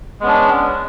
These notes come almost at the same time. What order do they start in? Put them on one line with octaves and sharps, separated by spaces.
G#3 B3 C#4 D4